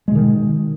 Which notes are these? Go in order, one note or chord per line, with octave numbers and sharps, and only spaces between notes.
B2 D#3 G#3